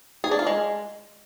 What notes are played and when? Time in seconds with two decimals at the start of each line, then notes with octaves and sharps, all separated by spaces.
0.24 G#4
0.31 D4
0.39 F4
0.47 G#3